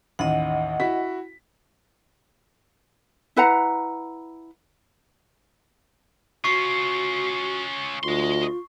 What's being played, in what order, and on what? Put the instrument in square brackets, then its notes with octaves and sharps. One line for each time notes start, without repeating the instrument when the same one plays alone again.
[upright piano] A1 D#2 [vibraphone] D#5 F#5
[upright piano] E4 F#4 B6
[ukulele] E4 B4 F#5 A#5
[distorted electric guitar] C#4 F4 [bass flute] F#4 [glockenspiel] C#6 C7
[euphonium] D2 [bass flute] F4 [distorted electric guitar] D#5 C6